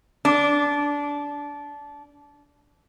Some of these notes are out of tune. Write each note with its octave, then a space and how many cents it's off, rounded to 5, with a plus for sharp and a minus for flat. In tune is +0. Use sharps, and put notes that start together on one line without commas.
D4 -20